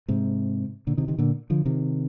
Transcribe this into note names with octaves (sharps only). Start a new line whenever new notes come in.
G#2 C3
A#2 D3
C3 D#3
C3 D#3
A#2 D3
D3 F3
C3 D#3